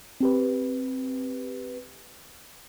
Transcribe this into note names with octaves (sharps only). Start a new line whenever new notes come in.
C4 G4 B4